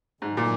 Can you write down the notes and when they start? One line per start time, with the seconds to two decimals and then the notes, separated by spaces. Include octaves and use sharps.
0.22 G#2 D3 F#3 A3
0.37 A#2